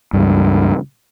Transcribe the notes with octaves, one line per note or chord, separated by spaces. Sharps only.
C#2 G2